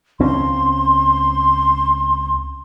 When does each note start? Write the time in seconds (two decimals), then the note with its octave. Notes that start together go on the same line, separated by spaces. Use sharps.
0.20 C#2 C4 C#4 C6